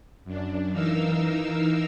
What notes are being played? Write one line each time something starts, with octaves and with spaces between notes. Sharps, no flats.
F#2 D4
E3 D#4 A#4 F5 E6